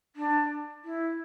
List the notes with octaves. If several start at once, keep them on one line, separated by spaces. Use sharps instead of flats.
D4
E4